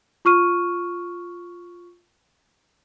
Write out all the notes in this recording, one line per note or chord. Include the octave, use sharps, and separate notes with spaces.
F4 C#6 F6 D#7